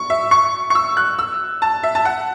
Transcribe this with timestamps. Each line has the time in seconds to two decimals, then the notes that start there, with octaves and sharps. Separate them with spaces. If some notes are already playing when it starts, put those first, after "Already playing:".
Already playing: C#6
0.10 E5
0.31 C#6
0.70 C#6
0.75 E6
0.97 F#6
1.19 E6
1.62 A5
1.83 E5
1.95 A5
2.05 F#5